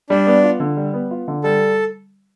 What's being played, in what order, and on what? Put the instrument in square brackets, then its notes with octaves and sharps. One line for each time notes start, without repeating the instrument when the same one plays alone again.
[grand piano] G3 [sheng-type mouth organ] D4
[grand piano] B3
F4
D3
G3
B3
F4
D3
[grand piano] G3 [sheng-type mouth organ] A4